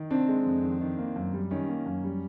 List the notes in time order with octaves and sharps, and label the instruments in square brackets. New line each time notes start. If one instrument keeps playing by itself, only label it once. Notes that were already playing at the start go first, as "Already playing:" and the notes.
Already playing: [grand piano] D#3
C3 C4 D4
G#3
F2
D#3
D#3
A#3
F#2
G3
D#3 C#4
A#3
F#2
G3